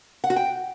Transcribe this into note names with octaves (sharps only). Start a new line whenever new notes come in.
F#5
F#4
G5